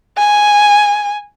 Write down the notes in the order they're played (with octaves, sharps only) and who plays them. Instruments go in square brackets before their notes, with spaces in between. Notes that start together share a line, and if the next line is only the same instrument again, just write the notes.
[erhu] G#5